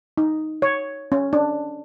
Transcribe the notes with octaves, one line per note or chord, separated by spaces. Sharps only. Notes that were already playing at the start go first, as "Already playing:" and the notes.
D#4
C#5
C#4
D4